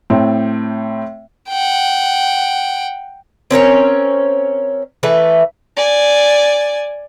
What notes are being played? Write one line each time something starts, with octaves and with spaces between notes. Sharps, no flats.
A2 C4
F#5 G5
C4 C#4 A#4 C#5
E3 A3 B4
D5 G#5